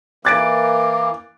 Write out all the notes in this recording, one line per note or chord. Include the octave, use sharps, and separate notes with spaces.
E3 A#3 D6 F#6 A6 D7